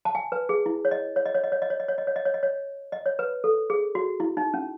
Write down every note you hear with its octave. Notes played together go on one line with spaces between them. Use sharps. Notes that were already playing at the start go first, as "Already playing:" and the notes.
A5
G#5
B4
G#4
E4
C#5
D#5
C#5
D#5
C#5
D#5
C#5
D#5
C#5
D#5
C#5
D#5
C#5
D#5
C#5
D#5
C#5
D#5
C#5
B4
A4
G#4
F#4
E4
D#4
C#4